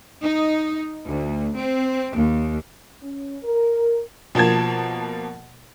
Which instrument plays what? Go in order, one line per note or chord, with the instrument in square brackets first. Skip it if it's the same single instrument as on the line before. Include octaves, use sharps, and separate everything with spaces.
[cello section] D#4
D2
C4
D#2
[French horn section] C#4
A#4
[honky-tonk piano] B2 F3 A#3 A5 G#6